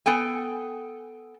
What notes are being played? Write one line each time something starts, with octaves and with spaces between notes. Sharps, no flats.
B3 A4 G5 G#5